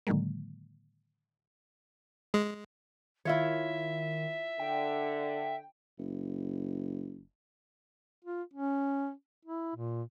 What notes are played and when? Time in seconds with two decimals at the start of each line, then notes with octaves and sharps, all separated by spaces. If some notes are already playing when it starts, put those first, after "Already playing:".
0.07 A2 D3 D#3 F#3 G#3 A#3
2.34 G#3
3.25 D#3 E4 F4 C#5 E5
4.60 D3 G5
5.99 F#1
8.25 F4
8.54 C#4
9.45 E4
9.75 A#2